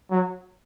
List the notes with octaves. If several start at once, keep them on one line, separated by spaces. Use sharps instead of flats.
F#3